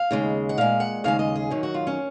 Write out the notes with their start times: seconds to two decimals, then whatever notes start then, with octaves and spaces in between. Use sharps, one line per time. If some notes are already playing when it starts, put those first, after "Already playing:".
Already playing: F5
0.11 D#2 C#3 G#3
0.49 F#5
0.57 A#2 G#3 F5
0.80 F#5
1.04 D#2 C#3 G#3 F5
1.19 D#5
1.36 G#4
1.51 F#2 D#3 F#3 C#4
1.63 F#4
1.74 F4
1.87 C#4